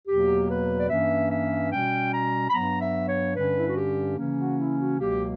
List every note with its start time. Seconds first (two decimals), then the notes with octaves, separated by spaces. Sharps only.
0.08 E2 B2 F#3 A#3 G4
0.50 B4
0.80 D5
0.89 G2 E3 A#3 C#4 E5
1.32 E5
1.72 B2 G3 C#4 G5
2.14 A#5
2.50 B5
2.54 G2 F#3 B3 A#5
2.81 E5
3.08 C#5
3.36 G2 D3 G3 C#4 B4
3.58 E4
3.67 F#4
3.76 G4
4.17 C#3 E3 A#3 C#4
4.39 F#4
4.58 E4
4.79 F#4
5.00 C#2 B2 F#3 A#3 G4